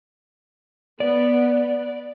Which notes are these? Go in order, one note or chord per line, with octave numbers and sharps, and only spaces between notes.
B3 D5